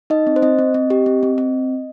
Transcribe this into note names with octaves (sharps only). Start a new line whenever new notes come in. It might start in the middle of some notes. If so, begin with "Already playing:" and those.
D#4 D#5
C4
C5
C4 D#5
C4
C4
G4
C4
C4
C4